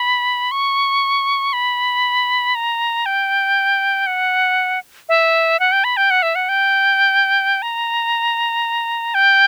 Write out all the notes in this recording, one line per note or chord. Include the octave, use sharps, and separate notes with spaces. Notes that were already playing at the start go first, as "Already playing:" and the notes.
Already playing: B5
C#6
B5
A#5
G5
F#5
E5
F#5
G5
B5
G5
F#5
E5
F#5
G5
A#5
G5